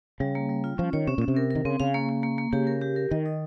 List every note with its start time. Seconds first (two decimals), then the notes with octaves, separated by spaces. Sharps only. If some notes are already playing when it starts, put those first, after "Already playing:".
0.20 C#3 G3
0.35 A#3
0.49 G3
0.64 F4
0.78 F3 C#4
0.93 D#3 C#5
1.07 C3 C#4
1.18 A#2 C#4
1.28 C3
1.37 A#4
1.51 D#3 A#4
1.65 C#3 C4
1.80 C#3 F5
1.94 A#3
2.09 A#3
2.23 A#3
2.38 A#3
2.53 C#3 G4
2.67 A#4
2.81 G4
2.96 A#4
3.11 D#3 D#5
3.26 D#4